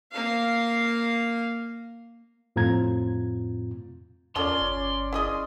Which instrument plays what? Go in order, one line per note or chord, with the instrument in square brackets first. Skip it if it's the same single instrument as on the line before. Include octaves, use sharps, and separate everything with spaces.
[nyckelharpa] A#3 F5
[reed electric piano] F2 A2 C4 F4 A#5 G#6
[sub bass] E2 [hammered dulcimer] C#4 D5 [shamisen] F4 A4 A#4 [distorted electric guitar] C6
[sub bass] G1
[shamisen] E4 G#4 D#5